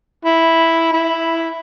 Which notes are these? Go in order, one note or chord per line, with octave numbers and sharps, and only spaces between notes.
E4
E4